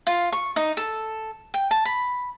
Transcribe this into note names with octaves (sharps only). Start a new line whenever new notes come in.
F4
C#6
D#4
A4
G5
A5
B5